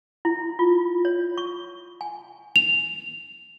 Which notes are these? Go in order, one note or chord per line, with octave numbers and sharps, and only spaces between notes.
E4
F4
C#5
C#6
G#5
F7